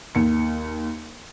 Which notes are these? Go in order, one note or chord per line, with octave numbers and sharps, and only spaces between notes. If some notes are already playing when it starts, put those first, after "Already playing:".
D#2 C#7